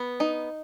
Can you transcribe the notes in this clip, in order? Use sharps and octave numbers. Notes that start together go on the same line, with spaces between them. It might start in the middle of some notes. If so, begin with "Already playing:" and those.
Already playing: B3
D#4